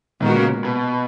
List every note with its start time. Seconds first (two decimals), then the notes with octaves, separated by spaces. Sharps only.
0.22 A#2 D#3 G#3 B3 F#4 A#4
0.36 C#3
0.65 B2